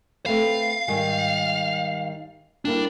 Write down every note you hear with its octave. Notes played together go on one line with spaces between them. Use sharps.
A3 C4 B4 F5
G#2 D#3 G3
G3 A#3 D4 E4